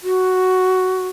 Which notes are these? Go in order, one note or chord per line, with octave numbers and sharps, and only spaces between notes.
F#4